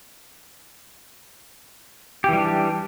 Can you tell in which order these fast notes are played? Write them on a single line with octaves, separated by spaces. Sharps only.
G4 E3 G3 D4